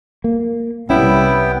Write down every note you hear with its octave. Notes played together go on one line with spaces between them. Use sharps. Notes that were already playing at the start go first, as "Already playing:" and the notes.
A#3
C2 G3 B3 C#4 E4 G5